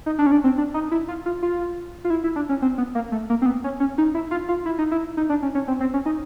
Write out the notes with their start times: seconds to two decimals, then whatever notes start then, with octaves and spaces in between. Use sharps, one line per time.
0.06 D#4
0.18 D4
0.26 C#4
0.32 D4
0.44 C4
0.58 D4
0.74 D#4
0.91 E4
1.08 F4
1.26 F4
1.42 F4
2.04 F4
2.10 E4
2.24 E4
2.36 D4
2.49 C#4
2.62 C4
2.78 B3
2.95 A#3
3.12 A3
3.30 A#3
3.42 C4
3.46 B3
3.64 C#4
3.80 C#4
3.98 D#4
4.15 E4
4.31 F4
4.49 F4
4.66 E4
4.78 D#4
4.91 E4
5.17 D#4
5.29 D4
5.42 C#4
5.55 C#4
5.68 C4
5.80 C4
5.94 C#4
6.06 D#4